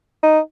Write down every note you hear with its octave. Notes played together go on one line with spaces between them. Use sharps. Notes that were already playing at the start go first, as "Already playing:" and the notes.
D#4